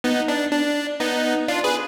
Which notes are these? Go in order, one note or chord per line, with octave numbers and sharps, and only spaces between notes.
B3 D#4
D4
D4
B3 D#4
D4 F4
G#4 B4